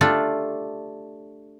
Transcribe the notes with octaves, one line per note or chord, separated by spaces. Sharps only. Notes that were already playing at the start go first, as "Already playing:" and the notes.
A3 D4 F4 G4 A4